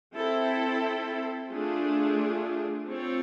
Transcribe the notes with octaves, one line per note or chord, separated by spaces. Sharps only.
C4 E4 A4
A3 D4 F4 G#4
C4 F4 A4 C#5